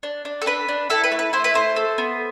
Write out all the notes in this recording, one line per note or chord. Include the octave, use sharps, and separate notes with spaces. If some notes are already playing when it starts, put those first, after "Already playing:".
D4
D4
A4
D4 B4
D4
E4 A4
B4
A3
B4
E4 C5
B4
A3 C5
A4
B3